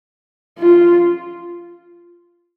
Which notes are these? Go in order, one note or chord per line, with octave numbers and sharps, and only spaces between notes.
F4